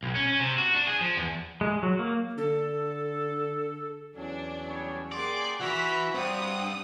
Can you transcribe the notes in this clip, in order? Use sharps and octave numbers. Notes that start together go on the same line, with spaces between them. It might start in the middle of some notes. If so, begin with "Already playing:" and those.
B1
C#4
C#4
C3
F#4
D4
G#4
F3
E2
G#3
F#3
A#3
D3 A4
E2 F#3 C#4 D4
G3 B3 C#5
A#3 G4 G#4 D5 F#5 C6 D6
E3 E4 F#4 B5 E6 B6
G2 G3 C4 G4 F#5 D#6